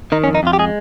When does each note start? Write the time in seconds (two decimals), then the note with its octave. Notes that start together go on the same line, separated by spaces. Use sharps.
0.12 D#3 D#4
0.24 C#4
0.28 F2
0.35 D#4
0.43 F2 F4
0.53 G4
0.59 G#3 G#4